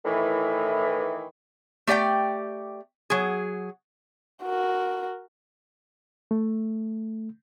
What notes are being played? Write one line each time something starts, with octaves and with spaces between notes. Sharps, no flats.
A2 D#3 E3
A3 G4 D5 F#5 G5
F#3 G#4
F#4 A#4
A3